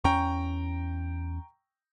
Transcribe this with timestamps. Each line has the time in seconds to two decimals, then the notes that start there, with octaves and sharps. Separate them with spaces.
0.04 E2 C#4 G5 A#5 C#6